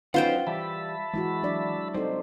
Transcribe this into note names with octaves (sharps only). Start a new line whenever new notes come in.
F#3 C#4 D#4 F4 B4 C5 F#5 G5
E3 G3 D5 E5 A5 B5
E3 G#3 E4 F#4
F#3 D4 D5
G3 C4 D#4 A4 C5